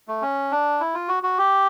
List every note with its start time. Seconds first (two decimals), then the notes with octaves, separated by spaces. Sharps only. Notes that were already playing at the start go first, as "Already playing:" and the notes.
0.08 A3
0.22 C#4
0.52 D4
0.80 E4
0.95 F4
1.08 F#4
1.23 F#4
1.38 G4